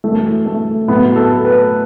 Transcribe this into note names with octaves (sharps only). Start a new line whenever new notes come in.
F#2 E3 A3
A3
A2 F#3 B3
A4
B4